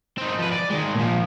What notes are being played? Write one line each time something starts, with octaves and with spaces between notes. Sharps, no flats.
C4 D#4
F3 B4
D5
D#3 G#3
A#2 F3